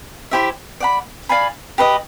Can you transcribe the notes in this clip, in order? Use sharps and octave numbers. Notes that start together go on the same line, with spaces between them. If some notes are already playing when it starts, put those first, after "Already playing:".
E4 G4 C5 E5
D5 F#5 B5
D5 F5 G#5 B5
G4 B4 D#5